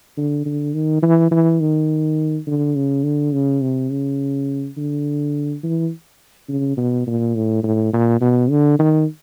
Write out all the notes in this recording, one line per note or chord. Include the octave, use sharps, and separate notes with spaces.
D3
D3
D#3
E3
E3
D#3
D3
C#3
D3
C#3
C3
C#3
D3
E3
C#3
B2
A#2
A2
A2
A#2
B2
D3
D#3